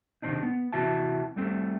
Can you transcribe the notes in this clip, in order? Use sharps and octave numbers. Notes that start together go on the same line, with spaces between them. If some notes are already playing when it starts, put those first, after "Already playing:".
C3 D#3 C4 D4 D#4
B3
C3 E3 F#4 E5 A5
G3 A3 C4